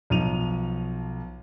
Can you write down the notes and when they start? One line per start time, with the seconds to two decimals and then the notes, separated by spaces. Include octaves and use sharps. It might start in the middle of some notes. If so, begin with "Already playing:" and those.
0.10 B1 F3 D#7 F7